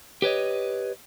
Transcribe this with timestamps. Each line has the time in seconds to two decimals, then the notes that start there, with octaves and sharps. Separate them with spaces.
0.22 G4 B4 C#5 D#5